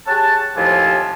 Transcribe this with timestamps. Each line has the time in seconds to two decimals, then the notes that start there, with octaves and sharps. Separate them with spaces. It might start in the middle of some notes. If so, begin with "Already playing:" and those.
0.08 G4 G#4 C#5 F#5 A5
0.56 D#2 A2 C3 F3 G#5 A5